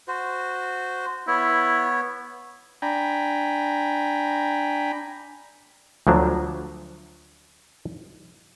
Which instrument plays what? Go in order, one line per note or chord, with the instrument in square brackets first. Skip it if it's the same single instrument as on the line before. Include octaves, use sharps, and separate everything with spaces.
[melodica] F#4 C5
[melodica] B3 C#5 [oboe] E4
[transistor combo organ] D4 G5 G#5 A#5 B5
[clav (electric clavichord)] D2 F3 F#3 D4